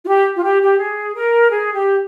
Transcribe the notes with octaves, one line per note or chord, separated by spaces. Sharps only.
F4
G4
F4
G4
G4
G#4
A#4
G#4
G4